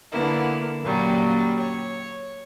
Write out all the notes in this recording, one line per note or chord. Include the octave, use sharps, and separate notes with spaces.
D3 A#3 B3 E4
F#2 A#2 F#3 G3
C#5